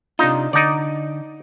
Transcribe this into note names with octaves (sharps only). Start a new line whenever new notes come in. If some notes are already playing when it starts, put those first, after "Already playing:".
C3 D4 D#4 F4
D3 D#4 D5